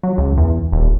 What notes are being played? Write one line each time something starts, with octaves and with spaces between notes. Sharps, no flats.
F#3
C#2
E2
D#1